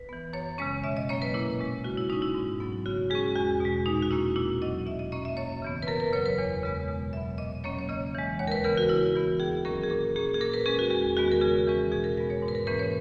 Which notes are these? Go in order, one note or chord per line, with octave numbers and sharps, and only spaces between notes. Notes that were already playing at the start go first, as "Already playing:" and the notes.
Already playing: B4
E3 B3
F#2 C#5
C#3 G#3 C#4 C#5
B2 E5
D#5
F#3 A#3 C#4 C#5
B4
A#2 E4
G#3 C#4
C#3 F#4
E4
G#3 C#4 D#4
E4
G#2
F#3 B3
C#3 F#4
G#3 C#4 G#4
E2 F#4
B2 G#3
A#2 D#4
F#4
A#3 C#4 E4
A#2 E4
F#3 C#4 D#5
B2 E5
D#5
A#3 C#4 D#5
E5
F#2 C#5
C#3 E3 B3
B4
F#2 A#4
B4
C#3 F#3 C#5
B4
E2 C#5
C#3 G#3 B3
B2
F#3 B3 E5
A#2 D#5
F#3 A#3 C#4 C#5
C#5
C#3 D#5
E3 G#3
D#2 C#5
A#4
B4
C#3 E3 B3 A#4
F#4
C#3 E4
E3 B3
D#2 G#4
D#3 F#3 A#3 C#4 A#4
G#4
A#2 A#4
A#3 C#4 G#4
G#4
A#2 A#4
B4
G#3 C#4 G#4
F#4
E2 G#4
D#3 G#3 B3 F#4
A#4
C#3 G#4
E3 G#3 C#4
B2 G#4
A#4
G#3 B3 A#4
C#5
G#2
B4
A#4
E3 A#3 C#4 B4
C#5